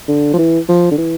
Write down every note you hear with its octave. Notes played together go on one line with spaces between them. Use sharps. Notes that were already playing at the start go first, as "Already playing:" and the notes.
D3
F3
E3
F3
D3
E3